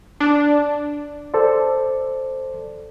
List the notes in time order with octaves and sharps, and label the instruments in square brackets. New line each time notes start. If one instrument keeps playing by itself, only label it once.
[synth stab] D4
[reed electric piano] A4 C5 D5